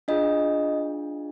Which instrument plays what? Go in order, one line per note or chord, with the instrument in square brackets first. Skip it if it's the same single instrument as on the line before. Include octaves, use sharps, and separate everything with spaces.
[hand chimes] D4 F4 G#4 D#5